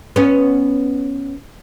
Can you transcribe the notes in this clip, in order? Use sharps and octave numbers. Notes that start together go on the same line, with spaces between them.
B3 C#4